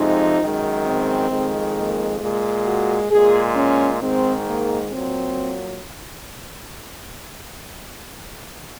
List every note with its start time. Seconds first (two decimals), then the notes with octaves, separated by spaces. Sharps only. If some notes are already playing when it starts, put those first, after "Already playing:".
Already playing: F2 C3 F3 G#3 D#4
0.40 F#2 D#3 G#3
0.85 C4
1.30 F2 D#3 G#3
1.75 A#3
2.20 A#2 G#3
2.65 F#4
3.10 A#2 G#3 G#4
3.56 C#4
4.01 G#2 D#3 G#3 C4
4.46 A#3
4.91 A#2 F#3 C4